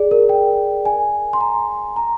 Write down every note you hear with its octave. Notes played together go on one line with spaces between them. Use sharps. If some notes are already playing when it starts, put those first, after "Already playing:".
Already playing: G#4 D5
A#4
G5
G#5
C6
A#5
A#5